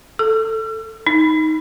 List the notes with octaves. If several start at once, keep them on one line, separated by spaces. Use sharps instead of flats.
A4
D#4